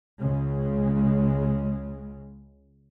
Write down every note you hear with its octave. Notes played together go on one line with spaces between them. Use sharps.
C#2 C#3 G#3